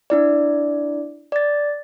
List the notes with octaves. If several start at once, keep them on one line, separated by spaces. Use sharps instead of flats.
D4 E4 D5
D5 A6